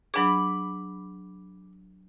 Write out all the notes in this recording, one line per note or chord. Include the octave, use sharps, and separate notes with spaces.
F#3 D4 G#4 B5 D6